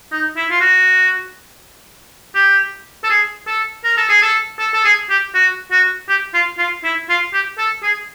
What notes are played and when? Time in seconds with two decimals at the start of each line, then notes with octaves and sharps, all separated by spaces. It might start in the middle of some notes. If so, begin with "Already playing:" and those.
0.12 D#4
0.36 E4
0.50 F4
0.60 F#4
2.35 G4
3.04 A4
3.10 G#4
3.47 A4
3.84 A#4
3.97 A4
4.09 G#4
4.22 A4
4.59 A4
4.74 A4
4.85 G#4
5.10 G4
5.34 F#4
5.71 F#4
6.09 G4
6.33 F4
6.58 F4
6.84 E4
7.09 F4
7.33 G4
7.58 A4
7.83 G#4